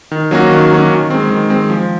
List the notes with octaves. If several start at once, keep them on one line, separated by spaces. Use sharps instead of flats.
D#3
F#3 A#3 C#4 F#4
D#3
F#3 A#3 C#4 F#4
D#3
G#3 C4
D#3
G#3 C4
F3